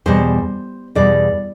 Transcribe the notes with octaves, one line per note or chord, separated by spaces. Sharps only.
E2 B2 G3 C5
E2 B2 G3 D5